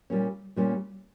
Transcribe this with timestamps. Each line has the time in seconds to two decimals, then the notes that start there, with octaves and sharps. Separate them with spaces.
0.10 A#2 G3 A#3 C#4
0.56 A#2 G3 A#3 C#4